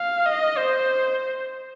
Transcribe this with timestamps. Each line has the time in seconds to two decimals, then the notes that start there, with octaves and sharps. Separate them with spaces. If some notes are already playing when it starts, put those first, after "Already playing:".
Already playing: F5
0.26 D#5
0.57 C5